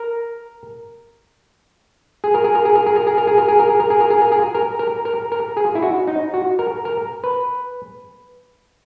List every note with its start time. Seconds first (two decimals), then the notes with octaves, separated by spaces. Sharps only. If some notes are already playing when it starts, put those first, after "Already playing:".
Already playing: A#4
2.24 G#4
2.34 A#4
2.44 G#4
2.55 A#4
2.65 G#4
2.75 A#4
2.86 G#4
2.96 A#4
3.07 G#4
3.18 A#4
3.27 G#4
3.38 A#4
3.48 G#4
3.59 A#4
3.69 G#4
3.80 A#4
3.90 G#4
4.01 A#4
4.10 G#4
4.22 A#4
4.32 G#4
4.55 A#4
4.79 A#4
5.05 A#4
5.32 A#4
5.57 G#4
5.75 E4
5.82 F#4
6.07 D#4
6.34 F#4
6.59 A#4
6.85 A#4
7.24 B4